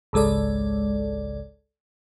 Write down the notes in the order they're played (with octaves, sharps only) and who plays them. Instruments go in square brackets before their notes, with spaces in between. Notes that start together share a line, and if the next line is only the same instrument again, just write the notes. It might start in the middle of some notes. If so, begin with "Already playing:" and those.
[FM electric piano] G#1 C#2 G#3 A4 D5